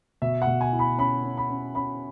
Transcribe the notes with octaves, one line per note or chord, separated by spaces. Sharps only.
B2 E5
F#5
B2
G#5
E4
B5
C#4 B5
C#4
B5
C#4
C#4 B5